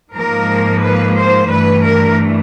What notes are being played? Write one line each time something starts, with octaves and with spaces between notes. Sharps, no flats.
G#2 F3 A#3 A#4
B4
C5
G2 E3 A3 B4
A#4